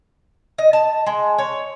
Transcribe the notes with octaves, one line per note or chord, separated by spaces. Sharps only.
D#5
A5
G#3
C#5